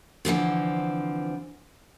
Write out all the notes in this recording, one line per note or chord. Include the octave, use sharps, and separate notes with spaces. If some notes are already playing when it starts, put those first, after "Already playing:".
D3 E3 F3 C4